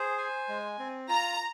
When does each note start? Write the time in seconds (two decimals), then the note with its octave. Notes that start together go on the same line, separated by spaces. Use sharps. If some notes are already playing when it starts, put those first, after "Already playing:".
Already playing: G#4 C5
0.18 G#5
0.48 G#3
0.79 C4
1.09 F4 A#5